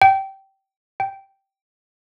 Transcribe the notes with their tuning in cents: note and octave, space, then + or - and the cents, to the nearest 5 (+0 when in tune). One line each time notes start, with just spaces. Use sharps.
G5 -15
G5 -5